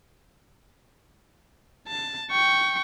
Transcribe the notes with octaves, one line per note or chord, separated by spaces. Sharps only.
A5
G5 C#6